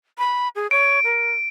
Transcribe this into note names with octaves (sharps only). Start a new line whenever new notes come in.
B5
G#4
C#5 D7
A#4